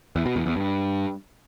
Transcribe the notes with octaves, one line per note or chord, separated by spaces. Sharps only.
E2
B2
E2
E2
G2